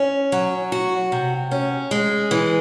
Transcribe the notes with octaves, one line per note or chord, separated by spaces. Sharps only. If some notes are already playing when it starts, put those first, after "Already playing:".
Already playing: C#4
F#3
F#4
C3
C#4
G#3
E3